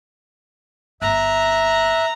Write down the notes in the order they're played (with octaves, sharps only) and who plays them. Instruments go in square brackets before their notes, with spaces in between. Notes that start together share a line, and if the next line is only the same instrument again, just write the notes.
[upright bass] G1 [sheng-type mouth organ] E5 F#6 [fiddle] A#5